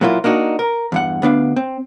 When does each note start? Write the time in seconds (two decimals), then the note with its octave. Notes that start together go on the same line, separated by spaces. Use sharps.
0.01 A#2 F#3 A#3 E4 F4
0.24 A#3 D4 D#4 F#4
0.59 A#4
0.92 E2 G2 F#5
1.22 D2 B3 D4 F5
1.56 C4